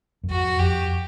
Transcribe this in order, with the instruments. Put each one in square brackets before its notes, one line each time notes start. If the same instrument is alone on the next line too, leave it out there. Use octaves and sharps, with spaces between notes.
[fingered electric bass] F#2
[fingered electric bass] F2 [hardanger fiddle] F#4
[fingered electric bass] F2 [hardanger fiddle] G4